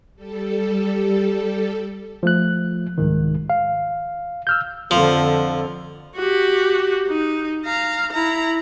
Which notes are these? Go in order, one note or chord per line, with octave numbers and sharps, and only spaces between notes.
G3 A4
F3 A3 F#6
C2 G#2 D#3
F5
E6 F6 G6
F2 D3 F3
F#4 G4
D#4
F5 A#5
E4 A#5